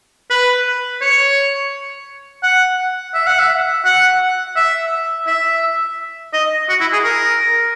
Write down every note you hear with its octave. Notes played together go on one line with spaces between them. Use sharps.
B4
C#5
F#5
E5
F#5
E5
F#5
E5
E5
D#5
F#4
E4
G#4
A#4